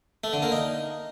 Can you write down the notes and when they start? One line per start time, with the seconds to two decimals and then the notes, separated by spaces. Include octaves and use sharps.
0.24 A3
0.33 D3
0.43 A#3
0.52 D#4